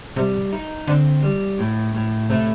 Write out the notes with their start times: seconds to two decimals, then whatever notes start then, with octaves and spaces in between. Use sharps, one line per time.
0.16 C3 G3
0.53 D#4
0.87 D3 C4
1.23 G3
1.59 A2
1.95 A2
2.30 C3 A3